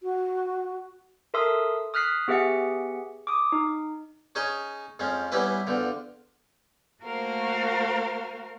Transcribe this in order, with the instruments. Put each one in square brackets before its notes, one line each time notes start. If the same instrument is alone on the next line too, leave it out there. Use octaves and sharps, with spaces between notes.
[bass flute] F#4
[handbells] A4 A#4 E5 C6 D#6 E6
D#6 F6 F#6 B6 C7
B3 G4 G#4 E5 F#5 C#7
D6 D#6
D#4
[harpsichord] C#4 D#4 G#4 C#5 D#5 G#5
F2 F3 G#3 C#4
E3 G3 B3 C#4 E4 B4
E2 D3 F3
[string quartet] A3 A#3 F#4 A#4 C5 F5